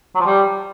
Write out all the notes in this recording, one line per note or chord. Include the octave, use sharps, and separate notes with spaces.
F#3
F3
G3